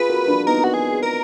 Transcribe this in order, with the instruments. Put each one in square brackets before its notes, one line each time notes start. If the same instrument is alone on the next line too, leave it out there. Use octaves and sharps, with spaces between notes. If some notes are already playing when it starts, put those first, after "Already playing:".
Already playing: [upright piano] F4 G#4 [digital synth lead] B4
[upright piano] F#4 A#4
D4 F4
[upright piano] B3 D#4 [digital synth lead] A#4
[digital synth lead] F#4
G#4
A#4